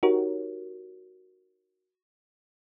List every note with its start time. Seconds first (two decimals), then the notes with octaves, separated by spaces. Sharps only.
0.03 D#4 F#4 G4 A#4 C#5